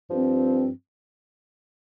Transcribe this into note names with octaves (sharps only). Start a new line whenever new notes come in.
G2 F3 C4